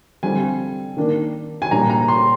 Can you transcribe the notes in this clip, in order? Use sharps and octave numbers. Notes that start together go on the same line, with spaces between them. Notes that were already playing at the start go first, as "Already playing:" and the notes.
D3 G3 C4 F4 G#5
D#3 A#3 D4
G#5
A#2 G3 D4 A#5
A#5
C6